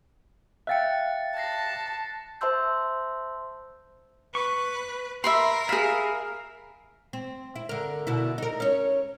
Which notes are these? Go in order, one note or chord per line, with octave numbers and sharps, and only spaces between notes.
E5 F5 G5 F#6 A6 C#7
A5 A6 A#6 C7
C5 E5 A5 C6 E6 G6
B4 C#6
A#4 E5 B5 C6
G#4 E5 F5 B5
C4
E4
D3 A#4
B2 D3 E4
D#4 A#4
C#4 C#5